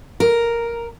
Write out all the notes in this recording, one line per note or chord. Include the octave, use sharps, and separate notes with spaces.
A#4